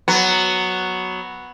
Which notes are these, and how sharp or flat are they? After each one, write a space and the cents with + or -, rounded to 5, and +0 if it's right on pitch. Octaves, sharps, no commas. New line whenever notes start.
F#3 +0 B3 +0